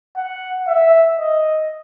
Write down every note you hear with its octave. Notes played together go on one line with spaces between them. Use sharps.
F#5
E5
D#5